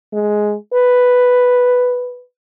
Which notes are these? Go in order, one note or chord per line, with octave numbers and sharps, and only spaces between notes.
G#3
B4